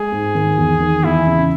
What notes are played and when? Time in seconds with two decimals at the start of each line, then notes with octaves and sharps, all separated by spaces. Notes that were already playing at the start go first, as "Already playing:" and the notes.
Already playing: G#3 G#4
0.12 G#2
0.35 D#3
0.58 E2
0.80 D#3
1.04 E2 E4
1.27 C#3